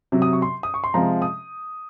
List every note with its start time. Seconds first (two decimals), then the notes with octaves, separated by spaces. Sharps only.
0.12 C3 F#3
0.22 D#6
0.33 C#6
0.42 C6
0.63 D#6
0.74 C#6
0.84 C6
0.94 C3 F3 G#3 A#5
1.22 D#6